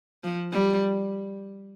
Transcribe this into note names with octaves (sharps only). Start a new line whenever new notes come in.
F3
G3